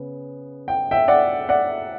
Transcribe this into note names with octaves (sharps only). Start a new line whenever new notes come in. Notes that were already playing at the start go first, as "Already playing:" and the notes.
Already playing: C#3 B3
G5
E5 G5
D5 F#5
D5 F#5